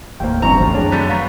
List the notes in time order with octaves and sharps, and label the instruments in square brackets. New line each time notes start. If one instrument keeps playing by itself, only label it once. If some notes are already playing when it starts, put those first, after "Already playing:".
[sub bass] F#1 [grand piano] D#2 A2 A#3 [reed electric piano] C5 G5
[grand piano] A1 G2 C#6 [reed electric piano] E3 C4 [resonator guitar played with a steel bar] A#5
[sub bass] C#2 [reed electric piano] D#3 F#3 A3 [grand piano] F3 F4
[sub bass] F#2 [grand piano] D4 G5 [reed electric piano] G#4 C#5
[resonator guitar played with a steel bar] D3 A3 B3 [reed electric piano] F#3
[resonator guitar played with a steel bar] B3 [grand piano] F5 A#5 C#6